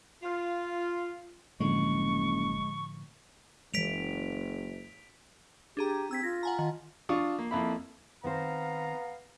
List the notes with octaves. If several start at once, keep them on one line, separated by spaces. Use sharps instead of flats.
F4
F#1 A2 D3 F3 G#3 C#6
F#1 E3 G#3 B6 D7 F7
D4 G4 G#4 A#5
C4 E6 G#6 B6
F4 A#6
F#5 G#5 A#5
D#3
D4 F4 C#6 D#6
A#3
F2 A#3 E4 B5
D#3 B3 C4 C5 F5 A#5